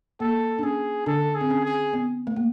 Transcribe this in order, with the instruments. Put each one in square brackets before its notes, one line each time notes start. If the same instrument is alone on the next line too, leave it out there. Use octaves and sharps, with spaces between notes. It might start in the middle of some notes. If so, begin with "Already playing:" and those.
[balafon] A#3 [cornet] A4
[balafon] D4
[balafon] C#4 [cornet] G#4
[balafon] D3 D4 [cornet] A4
[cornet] G#4
[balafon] C4
C#4
[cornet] G#4
[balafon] B3
A3
A#3